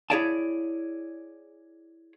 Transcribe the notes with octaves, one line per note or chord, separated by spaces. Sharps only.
E4 G#4 C#5 D5 F5 A5